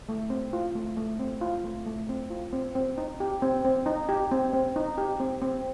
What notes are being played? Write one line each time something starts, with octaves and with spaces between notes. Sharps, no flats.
A3
C4
F4
A3
A3
C4
F4
A3
A3
C4
F4
C4
C4
D#4
G4
C4
C4
D#4
G4
C4
C4
D#4
G4
C4
C4